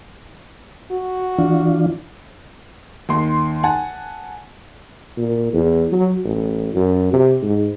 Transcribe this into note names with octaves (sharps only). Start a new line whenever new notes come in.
F#4
E3 D4 F4
D#2 C6
F#5 G#5 A5
A#2
E2
F#3
A1
F#2
C3
G#2